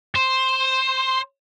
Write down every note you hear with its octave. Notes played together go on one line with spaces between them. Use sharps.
C5